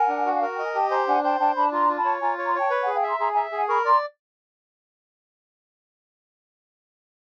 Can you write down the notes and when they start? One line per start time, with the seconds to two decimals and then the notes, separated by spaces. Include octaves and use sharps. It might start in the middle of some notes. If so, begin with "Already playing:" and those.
Already playing: A#4 F#5 G#5
0.08 D4
0.26 F#4
0.33 F5
0.41 A#4 F#5
0.54 D#5 G5
0.65 G#5
0.74 G4 G5 A5
0.90 C5 G#5 A#5
1.08 D4 F#5 G#5
1.23 C5 G5 A5
1.39 D4 G5 A5
1.56 D4 A5 B5
1.72 F4 A#5 C6
1.89 F4
1.97 A5 B5
2.05 C#5
2.21 F4 G#5 A#5
2.38 C#5
2.46 A#5 C6
2.55 C#5 G5 A5
2.70 B4
2.83 G#4 F#5 G#5
2.95 F5 G5
3.03 E5 A#5 C6
3.19 G#4 A#5 C6
3.32 E5 G#5 A#5
3.52 G#4 F#5 G#5
3.68 A#4 B5 C#6
3.85 D5 A#5 C6